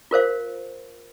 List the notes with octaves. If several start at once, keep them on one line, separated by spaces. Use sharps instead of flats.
F4 A#4 C5 F5